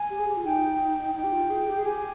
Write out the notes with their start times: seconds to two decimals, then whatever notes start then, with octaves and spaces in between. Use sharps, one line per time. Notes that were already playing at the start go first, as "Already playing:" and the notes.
Already playing: G#5
0.10 G4
0.19 G#4
0.28 G4
0.37 F4
0.45 D#4 G5
1.15 D#4 G5
1.24 G4
1.33 F4
1.50 G#4
1.68 G4
1.77 G#4
1.85 G4 G#5